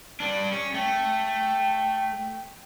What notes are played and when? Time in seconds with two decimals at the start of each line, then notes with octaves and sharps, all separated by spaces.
0.20 G3 D4
0.52 C#4
0.74 A3 G5